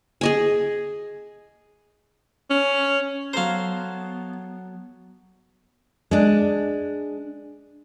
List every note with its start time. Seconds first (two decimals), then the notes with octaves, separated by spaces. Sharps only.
0.21 G#4 D#5 G#5
2.50 C#4
3.33 F#3 B3 A4 C5 F5 A#5
6.11 G#3 D4